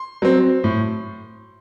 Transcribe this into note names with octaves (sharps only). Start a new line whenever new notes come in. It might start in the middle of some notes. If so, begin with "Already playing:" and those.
Already playing: C6
F#3 C4
A2